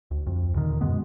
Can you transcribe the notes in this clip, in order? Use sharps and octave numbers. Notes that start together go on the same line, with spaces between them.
D2
F2
D#2 A#2 D3 D#3
F#2 B2 G#3 B3